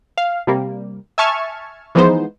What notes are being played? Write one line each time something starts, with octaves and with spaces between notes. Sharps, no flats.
F5
C3 G3 A#3
E5 G#5 A5 C#6 F6 G#6
E3 F3 G#3 B3 D#4 C5